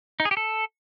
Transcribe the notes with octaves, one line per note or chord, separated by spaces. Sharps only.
D#4
G#4
G4
A4